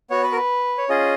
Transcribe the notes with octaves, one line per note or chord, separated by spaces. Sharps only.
B3 F#4 C#5
B4
A#4
B4
C#5
C#4 F4 G#4 D#5